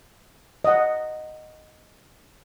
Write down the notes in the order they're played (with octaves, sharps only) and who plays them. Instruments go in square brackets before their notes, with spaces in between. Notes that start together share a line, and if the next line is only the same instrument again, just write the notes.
[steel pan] D#5 F#5